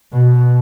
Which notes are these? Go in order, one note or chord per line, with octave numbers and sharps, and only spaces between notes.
B2